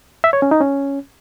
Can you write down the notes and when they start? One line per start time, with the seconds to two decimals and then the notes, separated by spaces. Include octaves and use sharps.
0.24 E5
0.33 C#5
0.42 C#4
0.51 D#4
0.61 C#4